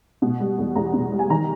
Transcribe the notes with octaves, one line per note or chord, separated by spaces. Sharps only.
B2
G3
E2
E2 A#5
B2
G3
G#5
D#3 A#5